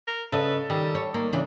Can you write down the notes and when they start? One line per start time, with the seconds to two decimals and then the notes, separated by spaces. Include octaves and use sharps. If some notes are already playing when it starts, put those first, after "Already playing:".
0.07 A#4
0.32 C#3 A4 B4 D#5
0.70 D#3 G3
0.95 C#5
1.14 D#3 A#3
1.33 C#3 E3 D4